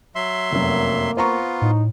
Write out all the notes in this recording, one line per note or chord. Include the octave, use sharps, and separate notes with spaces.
F#3 E5 C6
F1 F#2 A#3
B3 F4 C5 A#5 C#6
A2 D#4